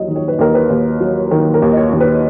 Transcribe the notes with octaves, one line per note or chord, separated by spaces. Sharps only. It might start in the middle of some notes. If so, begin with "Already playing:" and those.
Already playing: D#2 F#3 D#5
D#3
C#5
B4
D#2 A#4
B4
D#2
F#3
D#3 A#4
A#4
D#2
D#5
C#5
D#2
B4